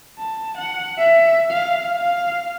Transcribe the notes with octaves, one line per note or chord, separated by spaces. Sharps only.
A5
F#5
E5
F5
F5